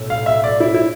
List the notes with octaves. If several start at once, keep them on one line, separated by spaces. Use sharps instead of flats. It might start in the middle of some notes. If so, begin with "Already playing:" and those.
Already playing: B1 A2
F5
E5
D5
E4
E4